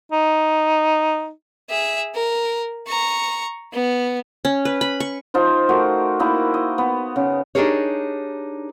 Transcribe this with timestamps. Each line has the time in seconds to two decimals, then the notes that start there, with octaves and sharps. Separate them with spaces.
0.12 D#4
1.70 G#4 E5
2.15 A#4
2.87 A#5 C#6
3.73 B3
4.45 C#4
4.65 B4
4.81 B5
5.00 C#6
5.34 F3 D#4 F4 C5
5.69 A3 F#4 A#4
6.20 A#3 D#4 E4
6.54 D#5
6.78 B3
7.16 C#3
7.55 D4 D#4 G4 G#4 A#4 C#5